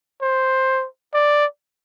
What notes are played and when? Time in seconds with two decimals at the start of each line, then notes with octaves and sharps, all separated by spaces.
0.22 C5
1.13 D5